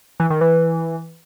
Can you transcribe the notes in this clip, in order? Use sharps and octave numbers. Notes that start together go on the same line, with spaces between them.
E3
D#3
E3